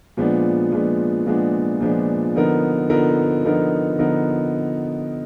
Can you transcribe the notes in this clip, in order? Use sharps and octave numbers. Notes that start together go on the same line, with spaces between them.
A#2 F3 G#3 B3 D4
A#2 F3 G#3 B3 D4
A#2 F3 G#3 B3 D4
A#2 F3 G#3 B3 D4
D3 F3 B3 D#4 A#4
D3 F3 B3 D#4 A#4
D3 F3 B3 D#4 A#4
D3 F3 B3 D#4 A#4